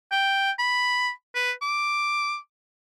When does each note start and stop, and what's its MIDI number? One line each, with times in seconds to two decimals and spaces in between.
0.11 0.51 79
0.59 1.10 83
1.35 1.52 71
1.62 2.37 86